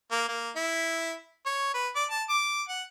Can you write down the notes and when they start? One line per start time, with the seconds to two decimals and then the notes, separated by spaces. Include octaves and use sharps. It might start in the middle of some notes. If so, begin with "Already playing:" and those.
0.12 A#3
0.28 A#3
0.56 E4
1.46 C#5
1.74 B4
1.96 D5
2.11 A5
2.29 D6
2.69 F#5